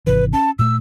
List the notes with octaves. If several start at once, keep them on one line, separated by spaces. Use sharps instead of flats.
G#1 C3 E3 B4
C#4 A5
A#2 A3 E6